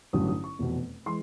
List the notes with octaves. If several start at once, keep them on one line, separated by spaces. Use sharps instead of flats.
A1 G2 D3 F#3 D#6
D#6
C#6
F1 E2 B2
E3 G#3 C6